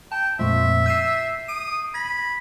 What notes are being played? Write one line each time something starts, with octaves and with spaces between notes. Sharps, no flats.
G5 A5
F2 A#2 F3 G#3 A3 E5
E6 G6 C7 D#7 E7
D#6 D7 D#7
B5 G#6 A#6